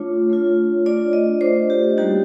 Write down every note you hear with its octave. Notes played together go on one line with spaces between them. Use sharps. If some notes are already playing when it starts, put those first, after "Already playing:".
Already playing: A3 D4 F4 C#5
A3 D4 F4
A3 D4 F4 D5
D#5
A3 D4 F4 C5
G4
G3 A#3 D#4 F#4 G4